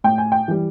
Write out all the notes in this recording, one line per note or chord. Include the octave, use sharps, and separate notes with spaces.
A2 G5
G#5
G5
E3 G3